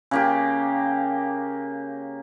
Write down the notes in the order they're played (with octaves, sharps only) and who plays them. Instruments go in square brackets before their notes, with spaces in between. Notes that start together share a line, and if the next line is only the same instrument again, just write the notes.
[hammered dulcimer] C#3 A#3 G4